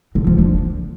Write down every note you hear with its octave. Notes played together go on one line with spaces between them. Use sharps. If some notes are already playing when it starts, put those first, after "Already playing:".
D3
F3
D4